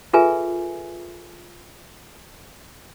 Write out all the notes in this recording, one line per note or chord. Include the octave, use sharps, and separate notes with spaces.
F4 G#4 A4 B4 E5 G#5